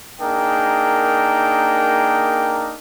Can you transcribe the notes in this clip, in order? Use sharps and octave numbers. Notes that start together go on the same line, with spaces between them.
A#3 D4 D#4 G#4 A#4 G5